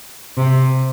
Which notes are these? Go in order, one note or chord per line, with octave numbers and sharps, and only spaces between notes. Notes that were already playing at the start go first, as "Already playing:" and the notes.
C3